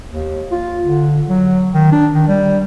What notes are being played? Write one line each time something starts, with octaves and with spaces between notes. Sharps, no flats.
D#2
F4
D3
F#3
D#3
D4
D#3
G3